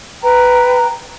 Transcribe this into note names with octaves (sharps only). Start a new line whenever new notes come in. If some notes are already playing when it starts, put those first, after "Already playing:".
B4 G5 A#5